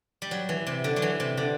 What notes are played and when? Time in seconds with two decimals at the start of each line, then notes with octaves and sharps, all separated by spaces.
0.22 G3
0.31 F#3
0.49 E3
0.67 C3
0.84 D3
0.96 F#3
1.02 E3
1.20 C3
1.37 D3